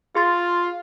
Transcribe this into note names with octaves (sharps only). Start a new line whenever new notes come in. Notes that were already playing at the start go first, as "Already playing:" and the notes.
F4 G#4 C6 A6